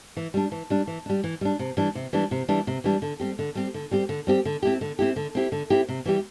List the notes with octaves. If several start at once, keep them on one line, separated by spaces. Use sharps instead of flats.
E3
G3 D4
E3
G3 D4
E3
G3 D4
E3
G3 D4
C3
E3 G3 D4
C3
E3 G3 D4
C3
E3 G3 D4
C3
E3 G3 D4
D3
G3 C4 G4
D3
G3 C4 G4
D3
G3 C4 G4
D3
G3 C4 G4
D3
C4 E4 G4
D3
C4 E4 G4
D3
C4 E4 G4
D3
C4 E4 G4
C3
E3 G3 E4 G4